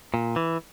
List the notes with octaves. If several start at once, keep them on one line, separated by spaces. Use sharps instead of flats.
A#2
E3